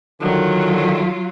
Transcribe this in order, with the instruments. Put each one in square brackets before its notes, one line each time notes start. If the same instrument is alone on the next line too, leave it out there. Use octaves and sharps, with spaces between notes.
[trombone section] D3 D#3 [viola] F#3 F4